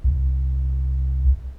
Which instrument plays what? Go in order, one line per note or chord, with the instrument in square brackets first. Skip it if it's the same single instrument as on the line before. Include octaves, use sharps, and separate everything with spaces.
[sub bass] C2